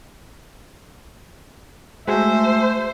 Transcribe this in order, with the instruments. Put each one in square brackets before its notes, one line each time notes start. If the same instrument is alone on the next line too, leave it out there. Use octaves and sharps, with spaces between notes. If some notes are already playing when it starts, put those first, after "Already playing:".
[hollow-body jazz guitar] G#3 F#4 G#4 [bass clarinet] A3 [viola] C5 [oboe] E5